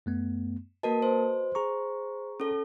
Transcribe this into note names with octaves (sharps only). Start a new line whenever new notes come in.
F#2 A3 B3
A#3 F#4 A#4 B4 D#5 A5
C5
G#4 A#5 C#6
C#4 A4